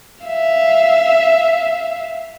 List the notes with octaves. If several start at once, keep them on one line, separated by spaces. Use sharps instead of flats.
E5 F5